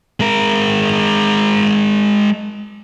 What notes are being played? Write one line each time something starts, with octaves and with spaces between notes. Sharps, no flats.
G#3 A#4